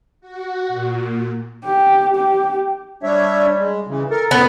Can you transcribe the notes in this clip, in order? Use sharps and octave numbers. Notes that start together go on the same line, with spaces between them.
F#4
A#2
G4
G4
G3 D4 C#5 E5
G#3
C#3 E3
A4 A#4
F#2 A#2 B3